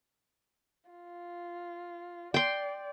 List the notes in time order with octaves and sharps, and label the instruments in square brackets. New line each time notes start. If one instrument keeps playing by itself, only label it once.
[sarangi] F4
[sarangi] D5 [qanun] G5 C6